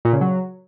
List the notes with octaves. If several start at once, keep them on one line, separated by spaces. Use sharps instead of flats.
A#2
C#3
F#3